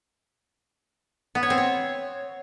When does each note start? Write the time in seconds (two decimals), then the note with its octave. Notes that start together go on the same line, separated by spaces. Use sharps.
1.35 B3
1.43 C#5
1.50 C4
1.58 C#5